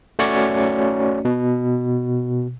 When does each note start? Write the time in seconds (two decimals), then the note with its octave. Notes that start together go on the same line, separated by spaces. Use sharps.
0.19 A3 C#4 F#4 C#5 D5 C#7
1.25 B2